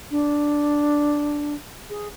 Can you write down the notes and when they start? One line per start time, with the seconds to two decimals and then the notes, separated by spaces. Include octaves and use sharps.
0.11 D4
1.90 G#4